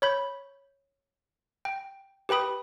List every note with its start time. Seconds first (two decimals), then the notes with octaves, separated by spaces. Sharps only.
0.02 C#5 B5 G6
1.65 G5
2.29 G4 B4 G5 B5 D#6